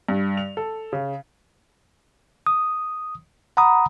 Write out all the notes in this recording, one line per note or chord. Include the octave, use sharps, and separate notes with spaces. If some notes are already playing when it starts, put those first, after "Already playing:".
G2
F7
A4
C#3
D#6
F#5 A#5 B5 D#6